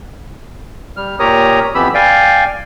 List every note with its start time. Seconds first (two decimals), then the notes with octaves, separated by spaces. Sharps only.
0.97 G3 F6
1.19 A#2 G4 A#4 C#5 A#5 D#6
1.75 F2 E3 B3 G4 B5 E6
1.94 D5 F5 G5 G#5